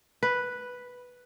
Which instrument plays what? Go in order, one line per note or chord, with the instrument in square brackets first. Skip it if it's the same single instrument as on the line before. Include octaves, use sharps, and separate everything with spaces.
[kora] B4